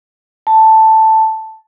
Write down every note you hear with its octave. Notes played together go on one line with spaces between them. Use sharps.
A5